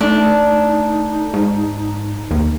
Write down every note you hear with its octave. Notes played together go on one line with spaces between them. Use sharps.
A3 D4 D#4
G#2
D#2